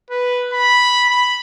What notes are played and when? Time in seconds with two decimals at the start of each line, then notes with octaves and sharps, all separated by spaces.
0.10 B4
0.53 B5
1.09 B5